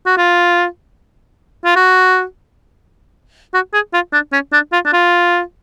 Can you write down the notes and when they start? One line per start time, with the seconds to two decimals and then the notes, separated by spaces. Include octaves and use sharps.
0.06 F#4
0.17 F4
1.65 F4
1.76 F#4
3.54 F#4
3.73 G#4
3.93 F4
4.13 D4
4.32 C#4
4.53 D4
4.72 F4
4.85 D4
4.93 F4